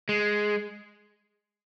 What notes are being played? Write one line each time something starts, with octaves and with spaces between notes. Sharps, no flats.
G#3